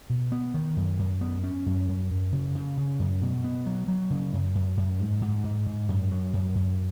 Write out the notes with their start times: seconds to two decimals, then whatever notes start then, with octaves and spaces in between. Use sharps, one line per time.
0.10 B2
0.32 B3
0.54 D#3
0.77 F#2
0.99 F#2
1.21 B3
1.43 C#4
1.66 F#2
1.88 F#2
2.10 F#2
2.33 C#3
2.55 C#3
2.77 C#3
3.00 F#2
3.21 B2
3.44 B3
3.66 F#3
3.88 F#3
4.10 C#3
4.33 F#2
4.55 F#2
4.77 F#2
5.00 G#2
5.22 G#2
5.44 G#2
5.66 G#2
5.89 F#2
6.11 F#3
6.33 F#2
6.55 F#2